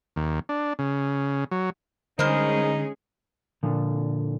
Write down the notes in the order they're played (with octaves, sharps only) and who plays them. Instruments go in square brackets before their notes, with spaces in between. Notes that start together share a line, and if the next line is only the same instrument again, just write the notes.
[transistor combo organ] D#2
D4
C#3
F#3
[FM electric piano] D3 [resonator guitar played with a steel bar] G3 A#4 C5 [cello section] G#3 C#4 G#4 [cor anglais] D#4
[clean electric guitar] A#2 D3 F3